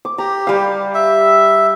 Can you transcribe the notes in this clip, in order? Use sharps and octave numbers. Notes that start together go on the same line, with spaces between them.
D6
G4 A#5
G3 F5
E5